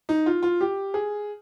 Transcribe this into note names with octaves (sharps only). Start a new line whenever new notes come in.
D#4
F4
F4
G4
G#4